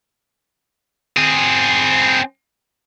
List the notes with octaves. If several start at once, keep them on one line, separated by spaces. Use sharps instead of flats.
C4 G#4